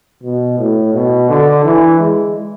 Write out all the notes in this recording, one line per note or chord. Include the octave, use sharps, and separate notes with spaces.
B2
A2
B2
D3
E3
G#3